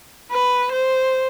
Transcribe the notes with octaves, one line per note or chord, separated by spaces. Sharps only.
B4
C5